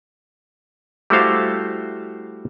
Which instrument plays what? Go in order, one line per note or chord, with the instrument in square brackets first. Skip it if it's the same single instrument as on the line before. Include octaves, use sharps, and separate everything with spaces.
[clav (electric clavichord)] G3 A3 E4 F#4 C5 F5